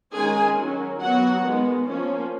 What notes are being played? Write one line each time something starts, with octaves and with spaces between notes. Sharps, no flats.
D#3 G#3 C#4 G#4 G#5
D#3 F#3 C#4
F#3 B3 F#4 F#5
D#3 G#3 B3
F3 A#3 C#4